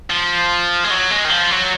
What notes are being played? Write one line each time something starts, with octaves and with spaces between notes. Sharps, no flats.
F3
G#3
F#3
G#3
D#3
F3
F#3